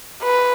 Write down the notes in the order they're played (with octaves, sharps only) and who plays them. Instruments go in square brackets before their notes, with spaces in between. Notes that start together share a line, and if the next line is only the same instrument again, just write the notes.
[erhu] B4